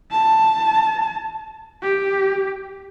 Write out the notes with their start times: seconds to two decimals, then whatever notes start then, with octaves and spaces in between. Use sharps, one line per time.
0.11 A5
1.82 G4